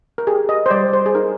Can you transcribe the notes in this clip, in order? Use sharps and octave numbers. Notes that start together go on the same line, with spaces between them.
A#4
G4 G#4
D#5
C5
G3 D5
C5
G#4
D#4 A#4